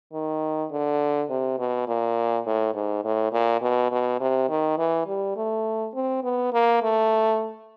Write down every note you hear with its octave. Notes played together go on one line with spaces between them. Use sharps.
D#3
D3
C3
B2
A#2
A2
G#2
A2
A#2
B2
B2
C3
D#3
E3
G3
A3
C4
B3
A#3
A3